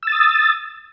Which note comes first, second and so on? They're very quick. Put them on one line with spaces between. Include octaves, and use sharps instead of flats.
E6 A6 D#6